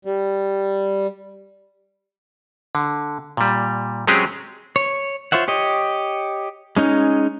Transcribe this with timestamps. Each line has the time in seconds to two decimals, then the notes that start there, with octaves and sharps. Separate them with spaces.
0.05 G3
2.75 D3
3.37 A#2 G3
4.07 F#3 G#3 C4 C#4 G4 G#4
4.76 C#5
5.32 F4 C5 C#5 E5 F#5
5.48 G4 C#5 D#5
6.77 G#3 C#4 D#4